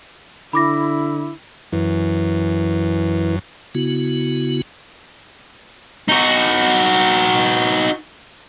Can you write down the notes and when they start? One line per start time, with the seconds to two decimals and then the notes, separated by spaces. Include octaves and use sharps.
0.53 D3 E4 B5 D6 A#6
1.73 F#2 E3
3.75 C#3 B3 E4 F#4
6.08 D#4 F#4